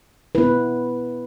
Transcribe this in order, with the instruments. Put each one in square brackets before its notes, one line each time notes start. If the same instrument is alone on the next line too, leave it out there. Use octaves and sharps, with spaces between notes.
[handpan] B3 E4 B4